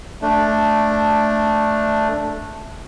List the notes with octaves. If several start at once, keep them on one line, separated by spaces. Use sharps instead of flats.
A3 D4